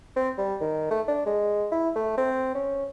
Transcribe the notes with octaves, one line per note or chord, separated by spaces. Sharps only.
C4
G3
D#3
A3
D4
G#3
E4
A3
C4
C#4